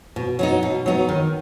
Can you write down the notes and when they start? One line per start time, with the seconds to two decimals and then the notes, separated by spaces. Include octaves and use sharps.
0.16 B2
0.39 F#3 B3 D#4
0.63 B2
0.86 F#3 B3 D#4
1.09 D#3